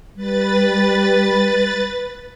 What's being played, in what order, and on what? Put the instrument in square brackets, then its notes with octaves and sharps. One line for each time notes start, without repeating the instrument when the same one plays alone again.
[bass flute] G3 [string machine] B4 A6